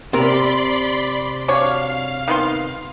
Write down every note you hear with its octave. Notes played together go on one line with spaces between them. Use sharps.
C3 A#4 D5 B5 C6
D4 F#4 C#5 F5
D#3 B3 C6